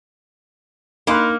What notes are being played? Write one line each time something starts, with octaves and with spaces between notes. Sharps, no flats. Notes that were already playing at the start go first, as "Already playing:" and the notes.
A#3 D#4 B5 C6 F#6